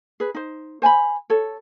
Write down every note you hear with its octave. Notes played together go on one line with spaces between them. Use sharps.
G#4 B4
D#4 C5
C5 G#5 A5 B5
A4 C#5